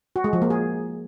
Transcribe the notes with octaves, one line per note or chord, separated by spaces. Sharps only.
F#4
G#3
F3
A#3
G#4